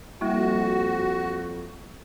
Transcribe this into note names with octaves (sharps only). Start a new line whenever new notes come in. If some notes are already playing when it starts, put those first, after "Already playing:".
F2 G3 A#3 E4 F#4